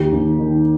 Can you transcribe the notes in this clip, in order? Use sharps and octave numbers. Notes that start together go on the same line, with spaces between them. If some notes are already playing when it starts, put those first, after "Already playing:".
Already playing: D#2 G4
D#2
D#3